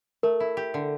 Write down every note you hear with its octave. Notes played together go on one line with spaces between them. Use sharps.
A3 A#4
E4
G4
D3